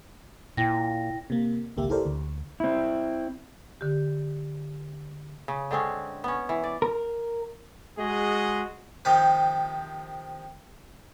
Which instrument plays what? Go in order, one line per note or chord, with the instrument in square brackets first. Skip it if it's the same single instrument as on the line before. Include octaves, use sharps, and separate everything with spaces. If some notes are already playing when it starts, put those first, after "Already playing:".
[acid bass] A#2 [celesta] E4 G5 A#6
[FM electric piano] C3 A#3
G#1 C#2 A#3 G4 E5
E4 G4 A4 A#4 C5 D5
D2
[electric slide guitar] C4 E4
[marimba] D3 G4
[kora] C#3
D3 G#3 C4 C#4
B3 C#4
E3
D5
[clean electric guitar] A#4
[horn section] G#3 F#4 G#4 D#5
[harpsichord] C3 D#3 F3 G4